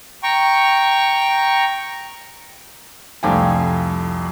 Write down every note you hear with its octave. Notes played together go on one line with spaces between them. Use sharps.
G5 A#5 C#6
C2 F2 A3 F5 G5 G#5